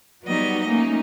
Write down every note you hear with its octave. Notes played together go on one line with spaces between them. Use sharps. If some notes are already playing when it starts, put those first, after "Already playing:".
F#3 G3 B3 D#4 F#4 D#5
A3 A#3 C#4 D#4